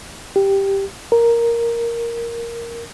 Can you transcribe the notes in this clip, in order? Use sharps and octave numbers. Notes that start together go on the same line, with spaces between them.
G4
A#4